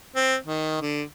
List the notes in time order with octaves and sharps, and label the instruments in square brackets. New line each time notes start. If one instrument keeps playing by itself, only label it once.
[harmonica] C4
D#3
D3